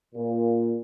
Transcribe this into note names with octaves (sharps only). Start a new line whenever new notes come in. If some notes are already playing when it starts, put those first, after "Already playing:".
A#2